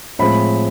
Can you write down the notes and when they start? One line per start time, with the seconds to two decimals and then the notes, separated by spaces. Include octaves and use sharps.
0.19 A2 F3 G#3 C4 B5